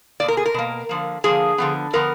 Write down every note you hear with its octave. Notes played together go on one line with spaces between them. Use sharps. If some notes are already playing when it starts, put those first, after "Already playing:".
B2 A#3 D5
A#4
G#4
A#4
B2 A#3
D3 F3 A#3
D3 F3 A#3 G#4
D3 F3 B3
D3 F3 B3 A#4